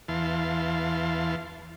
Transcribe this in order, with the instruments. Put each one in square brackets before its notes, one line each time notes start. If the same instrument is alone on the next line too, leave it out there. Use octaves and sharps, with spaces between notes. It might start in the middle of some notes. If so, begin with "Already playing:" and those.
[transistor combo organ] E2 E3 F5 A5 C6